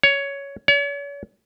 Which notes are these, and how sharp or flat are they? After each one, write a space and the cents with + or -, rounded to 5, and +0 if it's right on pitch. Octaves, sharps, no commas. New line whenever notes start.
C#5 +10
C#5 +40